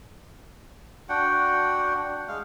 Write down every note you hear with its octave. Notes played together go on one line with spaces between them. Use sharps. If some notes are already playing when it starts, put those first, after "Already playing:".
D4 F#4 F#5 G5
G#3 F5